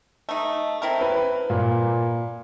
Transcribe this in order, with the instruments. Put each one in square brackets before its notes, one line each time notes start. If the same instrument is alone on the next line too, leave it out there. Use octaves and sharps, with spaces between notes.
[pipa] A3 D#4
C4 E4 A#4
[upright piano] B4
A#2